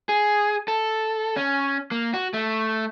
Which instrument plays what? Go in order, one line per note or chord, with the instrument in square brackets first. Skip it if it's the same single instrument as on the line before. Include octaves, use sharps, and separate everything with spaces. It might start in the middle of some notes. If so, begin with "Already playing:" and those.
[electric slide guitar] G#4
A4
C#4
A#3
F#4
A3